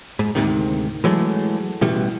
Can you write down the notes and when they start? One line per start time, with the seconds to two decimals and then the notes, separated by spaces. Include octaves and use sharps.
0.19 G#2
0.35 D2 G#2 C3 D#3
1.04 E3 F#3 G#3 A3
1.81 A1 B2 E3 G3